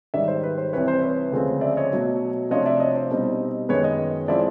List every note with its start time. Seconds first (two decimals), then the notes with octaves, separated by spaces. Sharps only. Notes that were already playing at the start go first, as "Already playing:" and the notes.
0.14 G#2 D#3 G3 D5 E5
0.28 C5
0.43 B4
0.58 C5
0.73 C2 C3 E3 B4 C#5
0.88 C5
1.02 B4 C#5
1.32 D2 C#3 F3 G#3 C4
1.61 D5 E5
1.77 C#5 D#5
1.92 B2 F#3 A3
2.50 C3 F3 A3 D4 F4 C#5 D#5
2.65 D5 E5
2.80 C#5 D#5
2.96 C5
3.10 B2 G3 C4 D#4
3.69 F#2 D#3 G#3 B3 B4 C#5
3.84 C#5 D#5
4.28 F3 G#3 C4 E4 D5 E5